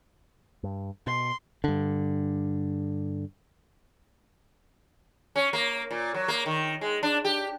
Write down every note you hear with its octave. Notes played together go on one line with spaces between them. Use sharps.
G2
B2 C6
G2 D3
C#4
A#3
A#2
F#3
A#3
D#3
G#3
D4
G4